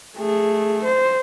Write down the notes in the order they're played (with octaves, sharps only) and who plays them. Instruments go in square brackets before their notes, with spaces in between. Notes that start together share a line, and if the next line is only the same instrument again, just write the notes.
[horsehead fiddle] A3 G#4
C5